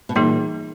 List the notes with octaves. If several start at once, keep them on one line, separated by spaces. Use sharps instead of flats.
B2
A#2 E3 G3 A#3 D#4 G#4